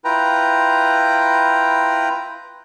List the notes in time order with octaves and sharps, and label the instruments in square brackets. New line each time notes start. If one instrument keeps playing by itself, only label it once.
[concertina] E4 F4 B4 G5 A#5